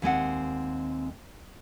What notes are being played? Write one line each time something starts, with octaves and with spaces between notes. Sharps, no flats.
D#2 G#3 C4 F#5